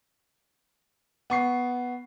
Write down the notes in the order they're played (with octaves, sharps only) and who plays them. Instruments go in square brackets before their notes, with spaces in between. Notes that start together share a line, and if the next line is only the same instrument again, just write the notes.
[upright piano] B3 C#6 C7